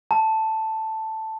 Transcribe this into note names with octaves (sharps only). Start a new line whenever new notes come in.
A5